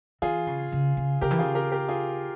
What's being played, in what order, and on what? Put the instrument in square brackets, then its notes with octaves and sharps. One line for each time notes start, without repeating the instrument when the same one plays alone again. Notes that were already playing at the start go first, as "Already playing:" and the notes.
[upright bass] E3 [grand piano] F4 G#4
[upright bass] C#3
C#3
C#3
[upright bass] C#3 [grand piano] G4 A#4
[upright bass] E3
[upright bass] C#3 [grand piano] F4 G#4
[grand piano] G4 A#4
G4 A#4
F4 G#4